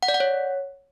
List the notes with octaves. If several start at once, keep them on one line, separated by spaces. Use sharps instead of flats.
F#5
D5
F#5
C#5